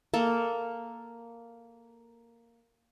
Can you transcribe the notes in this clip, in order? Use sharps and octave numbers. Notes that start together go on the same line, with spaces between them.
A#3 A4